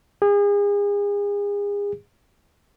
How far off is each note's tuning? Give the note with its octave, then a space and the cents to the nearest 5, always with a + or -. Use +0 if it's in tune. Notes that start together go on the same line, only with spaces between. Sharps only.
G#4 -35